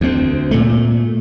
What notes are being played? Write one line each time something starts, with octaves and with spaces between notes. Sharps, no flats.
D2 C4
A#2 A3